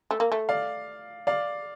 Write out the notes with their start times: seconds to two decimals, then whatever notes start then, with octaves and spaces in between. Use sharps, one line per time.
0.11 A3
0.20 A#3
0.32 A3
0.49 D5 F5
1.27 D5 F5